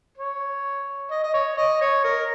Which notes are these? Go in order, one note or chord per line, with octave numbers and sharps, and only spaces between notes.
C#5
D#5
D#5
C#5
D#5
C#5
A#4